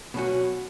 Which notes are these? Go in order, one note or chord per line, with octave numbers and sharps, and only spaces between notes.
B2 F#3 C#4 F#4